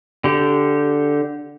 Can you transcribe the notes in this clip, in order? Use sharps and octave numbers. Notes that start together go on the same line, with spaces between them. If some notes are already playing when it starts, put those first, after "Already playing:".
D3 G4